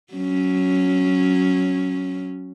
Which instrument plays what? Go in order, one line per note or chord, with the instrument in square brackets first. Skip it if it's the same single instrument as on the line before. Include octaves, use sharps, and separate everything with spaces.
[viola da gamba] F#3 C#4